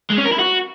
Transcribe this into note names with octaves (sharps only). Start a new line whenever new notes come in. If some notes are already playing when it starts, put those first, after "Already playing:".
G#3
C#4
A#4
E4
F#4